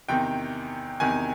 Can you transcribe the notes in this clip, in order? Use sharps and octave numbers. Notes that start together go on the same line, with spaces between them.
E2 C3 D#3 G5
E2 C3 D#3 G#5